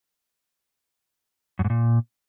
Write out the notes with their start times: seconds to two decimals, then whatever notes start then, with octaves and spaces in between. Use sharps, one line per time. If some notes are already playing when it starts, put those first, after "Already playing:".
1.59 F#2
1.65 G#2
1.70 A#2